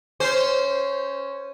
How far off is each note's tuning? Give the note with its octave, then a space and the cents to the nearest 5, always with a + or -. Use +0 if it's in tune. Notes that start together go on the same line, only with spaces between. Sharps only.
C#4 +0 C5 -15